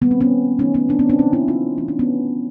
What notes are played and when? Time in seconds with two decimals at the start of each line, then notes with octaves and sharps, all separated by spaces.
0.02 D#3 G3 A#3 B3
0.11 C4
0.21 B3 C#4
0.59 D#3 F#3 A3 C#4 D#4
0.74 B3 C#4
0.89 C4 D4
0.99 B3 C#4
1.09 C4 D4
1.19 C3 F3 A#3 C#4 D#4
1.33 D4 E4
1.48 D#4 F4
1.77 E3 A3 C#4
1.88 D4
1.99 B3 C#4